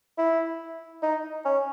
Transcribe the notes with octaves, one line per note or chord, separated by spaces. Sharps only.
E4
D#4
C#4